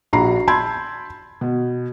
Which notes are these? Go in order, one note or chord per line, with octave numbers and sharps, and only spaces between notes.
A#1 D4 F#4 A#5 B5 C7
A5 B5 C6 E6 G6 G#6
B2